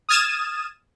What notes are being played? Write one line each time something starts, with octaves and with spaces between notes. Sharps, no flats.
D#6 F6 G#6 A6 D#7 E7